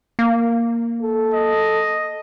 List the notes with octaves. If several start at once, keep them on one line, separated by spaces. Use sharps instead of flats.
A#3
A4
D#5